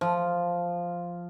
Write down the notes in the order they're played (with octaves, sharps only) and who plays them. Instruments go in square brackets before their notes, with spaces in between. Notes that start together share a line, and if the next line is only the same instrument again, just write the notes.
[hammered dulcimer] F3